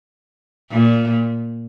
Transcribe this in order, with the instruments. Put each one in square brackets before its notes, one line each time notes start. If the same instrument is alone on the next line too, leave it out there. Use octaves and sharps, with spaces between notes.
[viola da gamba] A#2